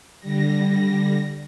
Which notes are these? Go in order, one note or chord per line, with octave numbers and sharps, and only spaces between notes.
D3 G3 A#6